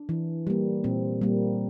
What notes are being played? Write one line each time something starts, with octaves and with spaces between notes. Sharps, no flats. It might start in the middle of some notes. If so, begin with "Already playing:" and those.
Already playing: D4
E3
G3 A#3
A#2 C4
G3 A#3